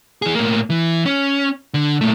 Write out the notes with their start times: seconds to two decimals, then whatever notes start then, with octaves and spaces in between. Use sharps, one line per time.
0.22 E3 G#4
0.35 A2 A#3
0.70 E3
1.06 C#4
1.74 D3
2.01 A#2 A3